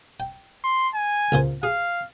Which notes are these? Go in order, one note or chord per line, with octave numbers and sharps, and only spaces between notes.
G5
C6
G#5
C#2 A#2 C5
G#4 F5